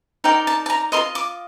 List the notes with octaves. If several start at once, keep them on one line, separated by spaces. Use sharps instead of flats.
D#4 A#4 D5 G5
A5
A5
A#5
F4 A#4 D#5 C6
D6